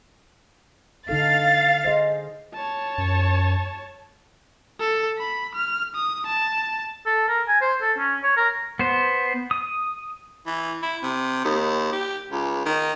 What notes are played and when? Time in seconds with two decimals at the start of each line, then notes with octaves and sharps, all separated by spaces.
1.09 D3 D#4 A4 F5 A6
1.85 G#4 C5 D#5
2.54 C#5 A5
2.98 F#2
4.80 A4
5.18 B5
5.54 F6
5.94 D#6
6.26 A5
7.06 A4
7.28 A#4
7.48 G#5
7.61 C5
7.82 A4
7.98 C#4
8.23 C#5
8.37 A#4
8.79 B3 C5
9.51 D#6
10.46 E3
10.82 E4
11.03 C3
11.45 D#2
11.92 G4
12.31 C#2
12.66 D#3